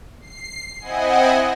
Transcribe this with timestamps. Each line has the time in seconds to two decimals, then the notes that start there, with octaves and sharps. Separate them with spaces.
0.21 C7
0.80 C4 E4 D#5 F#5 G#5